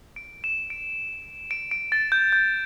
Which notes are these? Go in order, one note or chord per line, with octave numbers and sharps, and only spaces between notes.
D7
E7
D7
D7
D7
A6
G6
G6